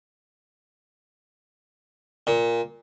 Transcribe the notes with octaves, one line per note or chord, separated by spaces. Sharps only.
A#2